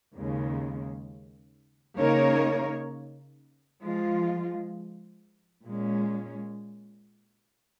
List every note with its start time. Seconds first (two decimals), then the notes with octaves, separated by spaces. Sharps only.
0.13 D#2 C#3 G#3
1.98 C#3 A#3 D#4 A#4 C#5
3.82 F3 G#3 F4
5.66 A#2 G#3 C#4